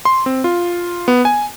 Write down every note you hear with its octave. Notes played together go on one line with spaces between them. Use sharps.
C6
C4
F4
B3
G#5